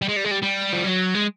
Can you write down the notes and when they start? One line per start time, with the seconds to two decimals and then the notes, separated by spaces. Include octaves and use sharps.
0.02 G3
0.08 G#3
0.16 G3
0.24 G#3
0.31 G3
0.42 G3
0.72 F3
0.84 F#3
1.14 G#3